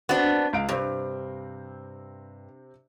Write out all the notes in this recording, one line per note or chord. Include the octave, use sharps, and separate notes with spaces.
B3 C4 D4 F#4
C#2 F5 D7
G2 C3 C4